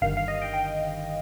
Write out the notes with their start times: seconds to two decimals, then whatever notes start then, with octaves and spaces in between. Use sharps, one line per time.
0.01 G1 G2 D#3 F5
0.17 F5
0.28 D#5
0.42 G5
0.54 G5